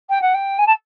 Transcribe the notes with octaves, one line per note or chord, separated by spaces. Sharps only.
G5
F#5
G5
G#5
A5